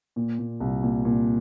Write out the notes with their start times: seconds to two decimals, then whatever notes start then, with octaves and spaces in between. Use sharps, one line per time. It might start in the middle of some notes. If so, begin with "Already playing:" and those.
0.16 A#2
0.39 A#2
0.60 C2
0.83 A#2
1.05 A#2